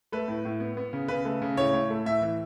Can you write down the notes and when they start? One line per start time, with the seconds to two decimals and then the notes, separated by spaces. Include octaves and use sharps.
0.12 A3 B4
0.28 A2
0.45 A2
0.60 B3
0.77 B3
0.93 C#3
1.08 C#3 B4
1.25 A3
1.42 C#3
1.57 A2 C#5
1.73 A2
1.90 A3
2.06 A2 E5
2.22 E3